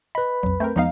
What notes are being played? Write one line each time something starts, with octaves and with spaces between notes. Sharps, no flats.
B4 D#5 B5
B1 F2 F#3
A3 C4 A#4 G6
E2 F3 G#3 B3 D#4 F5